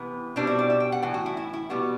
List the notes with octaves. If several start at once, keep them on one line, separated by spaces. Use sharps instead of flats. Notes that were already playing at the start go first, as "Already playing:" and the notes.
Already playing: C3 E3 B3 E4
B2 G3 C4 D4
E4
D5
E5
G5
F#5
A2 E3
F#4
E4
E4
E4
B2 G3 B3 F#4